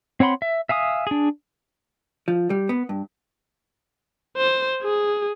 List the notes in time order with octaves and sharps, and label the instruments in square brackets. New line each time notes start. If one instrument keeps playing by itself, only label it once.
[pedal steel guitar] C4 C#5 F#5 B5 C6
E5
E5 F5 G#5 D#6
D4 G#4
[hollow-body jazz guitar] F3
G3
B3
G2
[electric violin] C5
G#4